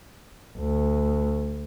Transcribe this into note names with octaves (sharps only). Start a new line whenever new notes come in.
D2